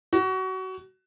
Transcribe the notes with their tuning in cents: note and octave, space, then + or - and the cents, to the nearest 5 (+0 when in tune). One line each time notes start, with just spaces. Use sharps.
F#4 +25